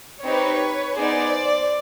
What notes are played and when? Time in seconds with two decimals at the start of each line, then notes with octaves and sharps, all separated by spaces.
0.23 C4 D#4 G4 B4 C#5
0.96 B3 D#4 G#4 C5 D5